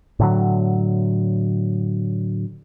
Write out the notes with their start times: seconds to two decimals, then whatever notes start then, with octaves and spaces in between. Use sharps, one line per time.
0.20 A2 D3 F#3